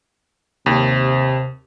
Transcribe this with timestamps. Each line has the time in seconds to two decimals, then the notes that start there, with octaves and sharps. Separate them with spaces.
0.66 D#2 C3